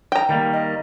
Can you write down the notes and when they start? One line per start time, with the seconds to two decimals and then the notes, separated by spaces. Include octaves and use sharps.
0.12 G5 A#5
0.29 D#3 G3 A#3
0.53 D#5